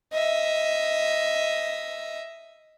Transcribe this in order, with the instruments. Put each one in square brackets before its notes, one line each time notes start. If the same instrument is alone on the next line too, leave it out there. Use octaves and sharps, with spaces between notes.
[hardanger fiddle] D#5 E5